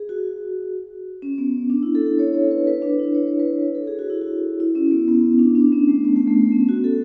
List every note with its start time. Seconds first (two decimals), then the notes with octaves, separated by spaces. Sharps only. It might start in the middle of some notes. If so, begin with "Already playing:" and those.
Already playing: G#4
0.09 F#4
1.22 C#4
1.38 B3
1.70 D4
1.83 E4
1.95 A4
2.06 A4
2.19 C#5
2.34 C#5
2.51 B4
2.67 B4
2.82 D4
2.99 E4
3.15 C#5
3.27 B4
3.40 B4
3.51 C#5
3.75 A4
3.87 G#4
3.99 F#4
4.10 E4
4.21 F#4
4.60 E4
4.75 C#4
4.91 B3
5.08 B3
5.39 D4
5.55 D4
5.72 C#4
5.88 A3
6.05 B3
6.16 A3
6.28 A3
6.40 B3
6.52 C#4
6.69 F#4
6.84 A4